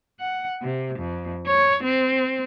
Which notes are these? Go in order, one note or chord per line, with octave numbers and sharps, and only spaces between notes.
F#5
C3
F2
C#5
C4